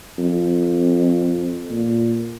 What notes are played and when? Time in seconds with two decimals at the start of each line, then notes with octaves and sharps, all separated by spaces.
0.18 F2
1.71 A#2